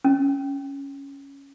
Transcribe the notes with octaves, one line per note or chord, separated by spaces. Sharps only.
C#4